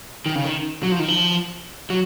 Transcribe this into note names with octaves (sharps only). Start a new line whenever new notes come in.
D#3
C#3
D#3
F#3
F3
D#3
F3
F#3